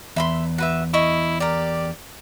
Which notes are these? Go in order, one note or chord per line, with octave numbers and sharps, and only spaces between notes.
E2 E5 B5 C6
F#4 B4 E5
E4 D#5 C#6
G4 A#4 D5